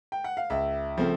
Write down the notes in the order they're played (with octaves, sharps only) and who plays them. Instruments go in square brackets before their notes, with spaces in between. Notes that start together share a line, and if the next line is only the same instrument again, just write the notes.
[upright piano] G5
F#5
F5
[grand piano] C#2 [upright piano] E5
[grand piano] C#3 F3 A3 C4